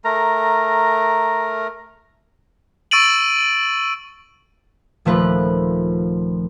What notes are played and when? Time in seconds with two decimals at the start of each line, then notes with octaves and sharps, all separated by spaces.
0.04 A3 A#4 A#5
2.91 C#6 E6 A6 D7 D#7 F#7
5.05 D#1 F3 A3 F4 B4